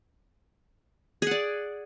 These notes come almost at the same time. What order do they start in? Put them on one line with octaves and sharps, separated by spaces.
G#4 F#5 D5